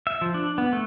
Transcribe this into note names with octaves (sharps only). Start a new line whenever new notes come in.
E5
F3
D4
B3
A3